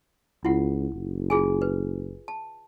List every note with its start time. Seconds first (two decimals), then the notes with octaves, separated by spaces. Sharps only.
0.45 C#2 E4 F4 F#5
0.94 F#1
1.30 F4 G#4 G#5
1.62 B4
2.28 A5